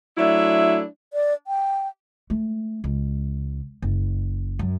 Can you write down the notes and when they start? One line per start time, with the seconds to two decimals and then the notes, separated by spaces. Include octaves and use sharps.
0.17 F#3 A3 D4 E4 E5
1.13 D5
1.47 G5
2.30 A3
2.84 C#2
3.82 F#1
4.59 F#2